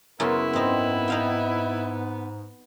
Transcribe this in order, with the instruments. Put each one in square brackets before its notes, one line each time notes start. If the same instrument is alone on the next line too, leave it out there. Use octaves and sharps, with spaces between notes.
[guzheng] F#2 C#3 C6 [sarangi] B3 [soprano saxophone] E4 [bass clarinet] A#4
[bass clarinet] G#2 [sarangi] B3 [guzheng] C4 D#4
[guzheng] D#4 F5 G5